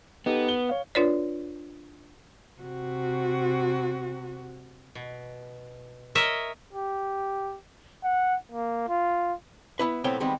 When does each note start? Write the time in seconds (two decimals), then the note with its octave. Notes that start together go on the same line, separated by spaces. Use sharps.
0.26 B3 D#4 G4 A4
0.48 G7
0.69 C#5 F5
0.95 D4 F4 B4 C#5 D5
2.61 C3 F#4
4.95 B2
6.15 A#4 C#5 D#5 E5
6.73 G4
8.04 F#5
8.51 A#3
8.88 F4
9.79 B3 E4 B4
10.04 B1 A2 B3 C4 C#5 G5
10.20 D#3 G3 G#3 B3 C4